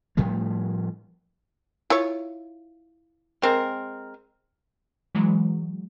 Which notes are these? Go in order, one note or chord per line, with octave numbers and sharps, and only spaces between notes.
A2 F3 G3 A3
E4 F4 C#5
G#3 C4 A#4
E3 F#3 G#3